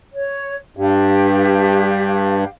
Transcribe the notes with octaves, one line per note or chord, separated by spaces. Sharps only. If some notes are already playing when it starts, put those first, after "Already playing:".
C#5
G2 G4 F5